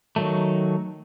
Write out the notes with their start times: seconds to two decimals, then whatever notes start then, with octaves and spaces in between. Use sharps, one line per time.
0.16 D#3 F#3 A3